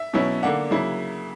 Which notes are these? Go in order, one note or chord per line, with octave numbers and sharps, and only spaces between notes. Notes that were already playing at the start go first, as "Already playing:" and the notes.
Already playing: E5
B2 F#3 C#4 E4
D3 A#3 D4 F#5
C#3 F#3 A#3 E4